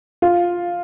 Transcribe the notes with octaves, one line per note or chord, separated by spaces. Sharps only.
F4